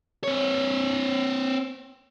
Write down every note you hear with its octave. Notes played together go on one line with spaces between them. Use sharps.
C4 C#5